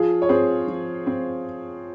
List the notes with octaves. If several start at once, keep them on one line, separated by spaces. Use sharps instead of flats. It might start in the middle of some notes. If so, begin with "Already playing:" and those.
Already playing: F3 F4 G#4
C#5
C4 G#4 C5
F3
C4